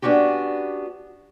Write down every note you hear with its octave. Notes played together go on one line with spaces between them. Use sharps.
B3 C#4 D4 F#4 G4